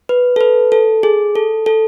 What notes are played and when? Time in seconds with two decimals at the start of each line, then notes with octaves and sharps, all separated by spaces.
0.09 B4
0.36 A4
0.41 B4
0.72 A4
1.03 G#4
1.36 A4
1.66 A4